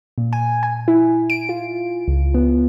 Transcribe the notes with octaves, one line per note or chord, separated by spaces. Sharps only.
A#2
G#5
G#5
E4
D7
F4
C#2
B3